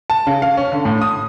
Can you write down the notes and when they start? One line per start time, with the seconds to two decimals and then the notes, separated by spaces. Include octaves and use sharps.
0.10 A5
0.27 C#3
0.42 F5
0.57 C#4
0.72 D3
0.85 A2
1.01 D#6